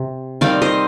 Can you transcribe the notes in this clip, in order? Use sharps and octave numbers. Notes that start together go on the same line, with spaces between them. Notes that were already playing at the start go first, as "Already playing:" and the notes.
Already playing: C3
D#3 G3 C4 D5 F5
C5 D#5